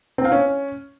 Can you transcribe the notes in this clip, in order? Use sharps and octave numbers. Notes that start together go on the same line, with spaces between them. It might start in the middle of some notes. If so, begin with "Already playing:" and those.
C4
F5
C#4